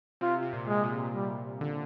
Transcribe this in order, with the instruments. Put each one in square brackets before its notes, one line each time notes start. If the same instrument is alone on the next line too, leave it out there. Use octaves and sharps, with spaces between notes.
[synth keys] C3 [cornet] F4
[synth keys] C3
A#2
[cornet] G#3
[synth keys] A#2
[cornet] G3
[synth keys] D3